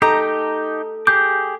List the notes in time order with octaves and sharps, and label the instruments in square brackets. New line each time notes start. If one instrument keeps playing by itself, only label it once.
[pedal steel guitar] D#4 G4 [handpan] A4 [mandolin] A#5
[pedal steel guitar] G4 G#4 D6 [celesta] G6